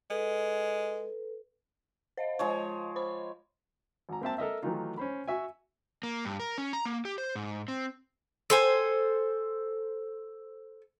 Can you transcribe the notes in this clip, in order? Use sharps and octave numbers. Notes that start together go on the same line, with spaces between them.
G#3 A4 B4
C5 D#5 F5
F3 G#3 C#5
C5 B5 D6
G#1 A#5
A#3 C4 E5 A5
A4 A#4 D#5 E5
D#3 E3 F#3 A3 D#4 F4
C#4 C5 B5
F#4 E5 G#5
A#3
G2
A#4
C#4
A#5
A#3
G4
C5
G#2
C4
A4 C5 G#5